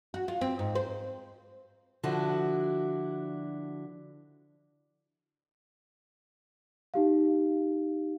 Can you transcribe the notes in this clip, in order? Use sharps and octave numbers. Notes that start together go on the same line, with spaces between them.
F#4
F4
C4
G#2
C5
D3 F3 D4 E4 F#4
D#4 G4 F5